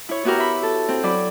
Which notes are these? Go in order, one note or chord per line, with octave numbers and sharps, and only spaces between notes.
E4 C#5
B3 E4 F#4 G4 A#4
E5 B5
A4
C4
F#3 D5 B5